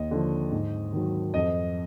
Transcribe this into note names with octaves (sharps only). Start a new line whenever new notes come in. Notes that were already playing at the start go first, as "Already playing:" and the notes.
Already playing: D#2 D#5
D3 F3
G#2
D#3 F#3
F2 D#5